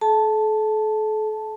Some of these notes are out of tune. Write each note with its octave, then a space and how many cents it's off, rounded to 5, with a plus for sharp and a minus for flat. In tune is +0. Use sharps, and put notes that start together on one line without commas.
A4 -40 A5 +0